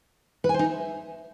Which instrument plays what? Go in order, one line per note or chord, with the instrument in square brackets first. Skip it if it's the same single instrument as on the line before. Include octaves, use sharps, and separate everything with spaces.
[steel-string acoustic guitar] B4
G#5
C5
D#4
E5